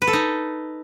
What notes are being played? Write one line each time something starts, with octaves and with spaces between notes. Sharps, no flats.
B4
A4
D#4